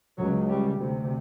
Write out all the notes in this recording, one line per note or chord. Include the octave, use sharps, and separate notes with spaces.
C#2 C#3 F#3
G3
D2 C3